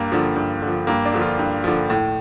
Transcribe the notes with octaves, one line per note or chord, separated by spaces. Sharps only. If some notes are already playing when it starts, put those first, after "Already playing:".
Already playing: G2 A#3
D3 F3
G2
D3
F3
G2 A#3
D4
D3 F3
F4
G2
D3 F3
A2